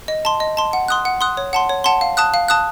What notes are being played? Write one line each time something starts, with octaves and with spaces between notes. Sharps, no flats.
D#5
A5 C6
D#5
A5 C6
F#5
C6 D#6 F#6
F#5
C6 D#6 F#6
C#5
F#5 A5 C6
C#5
F#5 A5 C6
F5
A5 D#6 F#6
F5
A5 D#6 F#6